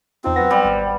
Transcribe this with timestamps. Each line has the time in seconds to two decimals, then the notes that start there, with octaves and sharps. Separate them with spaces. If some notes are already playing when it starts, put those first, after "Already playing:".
0.24 E2 C4 D#4 F4
0.36 F#3 B3 A#6
0.51 G3
0.65 G#1